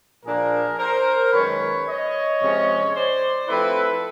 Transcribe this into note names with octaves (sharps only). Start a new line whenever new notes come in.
A#2 F3 A#3 D4 F4 G#4 A#4
A#4 C5
F#2 D#3 G#3 C#4 B4 C#5
C#5 D#5
C3 F3 G#3 C#4
C5 D5
F3 A3 C4 E4 A4 B4